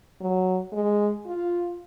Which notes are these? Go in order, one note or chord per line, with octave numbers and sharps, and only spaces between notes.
F#3
G#3
F4